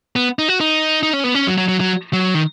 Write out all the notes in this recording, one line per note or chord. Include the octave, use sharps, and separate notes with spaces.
B3
D#4
F#4
D#4
D#4
C#4
B3
C#4
F#3
F#3
F#3
F#3
F#3
D#3